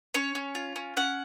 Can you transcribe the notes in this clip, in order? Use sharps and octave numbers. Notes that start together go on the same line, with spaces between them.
C#4 C#5
C#4
F4
C#4
C#4 F#5